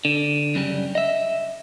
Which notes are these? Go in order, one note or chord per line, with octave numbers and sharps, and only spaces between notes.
D3
F#2 C#3 G3
D#5 E5